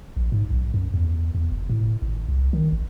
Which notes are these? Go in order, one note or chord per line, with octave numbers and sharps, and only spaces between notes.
A#1
G#2
B1
F#2
E2
E2
F#1
A2
G#1
C2
D#3
G#1